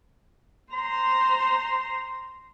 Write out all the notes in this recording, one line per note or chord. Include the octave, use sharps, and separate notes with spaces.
C5 A#5 C6